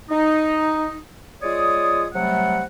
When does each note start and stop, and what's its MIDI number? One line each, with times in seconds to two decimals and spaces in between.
0.09 0.95 63
1.42 2.06 56
1.42 2.06 65
1.42 2.06 73
1.42 2.06 74
1.42 2.06 87
2.13 2.63 48
2.13 2.63 54
2.13 2.63 55
2.13 2.63 57
2.13 2.63 78